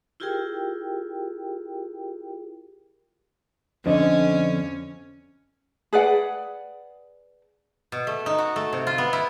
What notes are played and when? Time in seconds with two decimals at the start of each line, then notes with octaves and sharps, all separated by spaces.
0.20 E4 F4 G4 G#4 A#4 G5
3.86 F2 D3 C#4 D4 C5 D#5
5.93 G#4 B4 D5 F#5
7.92 B2
8.07 A3
8.26 D#4
8.38 F#4
8.56 A3
8.73 C3
8.87 F4
8.98 B3
9.13 E4